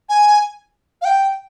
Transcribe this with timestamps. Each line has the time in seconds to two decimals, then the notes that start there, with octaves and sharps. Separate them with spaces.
0.09 G#5
1.02 F5
1.05 G5